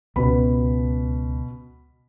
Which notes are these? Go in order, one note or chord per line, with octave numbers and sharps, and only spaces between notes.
C#2 B2 B4 B5